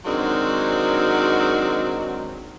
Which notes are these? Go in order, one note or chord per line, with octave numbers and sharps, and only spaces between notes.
D#3 F#3 G#3 C4 D4 F#4